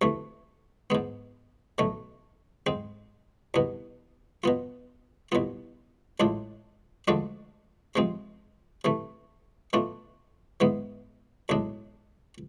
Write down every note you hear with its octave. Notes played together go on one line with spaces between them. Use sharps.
D2 C3 E3 A3
G#2 G#3 B3
B1 B2 A3
G#2 G#3 C4
C2 B2 B3
B2 B3 F4
C2 B2 B3 F4
A1 A2 G#3 D4 F4
D2 D3 F3 G#3 D4
C3 F3 G#3 C4
C3 E3 A3
B2 A3 D4 F4
G#2 E3 G#3 B3
B1 A2 G#3 D4